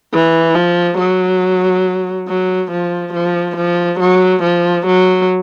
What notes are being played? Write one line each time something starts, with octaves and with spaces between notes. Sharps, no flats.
E3
F3
F#3
F#3
F3
F3
F3
F#3
F3
F#3